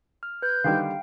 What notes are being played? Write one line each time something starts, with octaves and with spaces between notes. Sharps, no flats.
F6
B4 F#6 G6
D3 D#3 G3 F5 G5